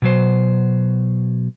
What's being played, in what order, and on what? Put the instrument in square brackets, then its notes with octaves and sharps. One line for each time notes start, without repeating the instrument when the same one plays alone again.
[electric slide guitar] B2 F#3 C5